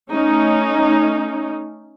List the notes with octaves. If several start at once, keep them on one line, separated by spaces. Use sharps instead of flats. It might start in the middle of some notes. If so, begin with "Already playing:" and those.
A3 C#4 D#4